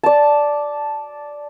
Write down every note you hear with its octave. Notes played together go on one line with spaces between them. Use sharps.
D5 A5